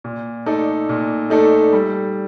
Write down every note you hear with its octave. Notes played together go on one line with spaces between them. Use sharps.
A#2
A3 D#4 A4 D5
A#2
A3 D#4 A4 D5
G3